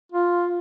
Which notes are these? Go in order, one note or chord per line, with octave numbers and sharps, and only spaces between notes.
F4